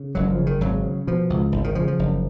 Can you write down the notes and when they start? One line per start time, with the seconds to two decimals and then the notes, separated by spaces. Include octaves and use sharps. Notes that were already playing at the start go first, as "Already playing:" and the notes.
Already playing: C#3
0.15 F#1 F#3
0.30 F3
0.39 C#3
0.46 D#3
0.61 G#1 F#3
0.83 C#3
1.07 B2 F3
1.30 C#2
1.52 G#1
1.64 D#3
1.75 C#3 F3
1.88 F3
1.99 F#1